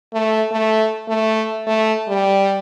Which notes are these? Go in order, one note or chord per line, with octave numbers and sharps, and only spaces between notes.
A3
A3
A3
A3
G3